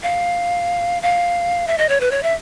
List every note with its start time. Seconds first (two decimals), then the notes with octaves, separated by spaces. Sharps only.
0.03 F5
1.02 F5
1.67 E5
1.78 D#5
1.89 C#5
2.01 B4
2.11 C#5
2.23 E5